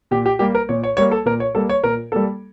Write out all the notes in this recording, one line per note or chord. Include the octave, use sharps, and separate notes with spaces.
A#2 G4
G4
G3 A#3 G4
A#4
A#2 C#5
C#5
G3 A#3 C#5
A4
A#2 A#4
C#5
G3 A#3 A4
C#5
A#2 A#4
G3 A#3 A4